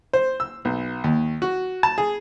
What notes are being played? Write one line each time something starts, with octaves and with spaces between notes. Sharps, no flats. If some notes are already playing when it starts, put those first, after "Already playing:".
C5
E6
B1
D#2
F#4
A5
G#4